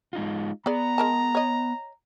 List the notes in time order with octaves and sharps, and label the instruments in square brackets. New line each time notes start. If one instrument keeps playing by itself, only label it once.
[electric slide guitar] G#3 D#4 F4
[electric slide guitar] B3 [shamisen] G#4 D5 [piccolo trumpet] A#5
[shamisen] G#3 A#4 A5
C#5 D#5